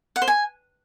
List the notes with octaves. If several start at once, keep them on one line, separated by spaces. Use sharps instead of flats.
F#5
C5
G#5